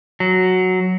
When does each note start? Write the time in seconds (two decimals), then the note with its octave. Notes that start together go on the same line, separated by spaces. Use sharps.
0.20 F#3